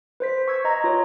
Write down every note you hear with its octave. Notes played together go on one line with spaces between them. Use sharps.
B4 C5 B6
C#6 E6 G#6
D#5 A#5
F4 B4 C#5